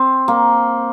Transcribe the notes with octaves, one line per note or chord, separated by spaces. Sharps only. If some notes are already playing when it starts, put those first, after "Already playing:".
Already playing: C4
A#3